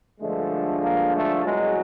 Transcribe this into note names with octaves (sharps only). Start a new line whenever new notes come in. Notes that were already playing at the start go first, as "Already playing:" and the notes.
G2 D3 F3 G#3 A3
A#3
A3
C2 B2 F#3 G#3